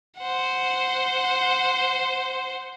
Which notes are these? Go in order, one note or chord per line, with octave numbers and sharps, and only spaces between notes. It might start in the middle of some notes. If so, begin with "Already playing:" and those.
C5 F#5